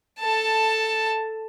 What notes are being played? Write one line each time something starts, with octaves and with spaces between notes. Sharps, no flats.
A4 A5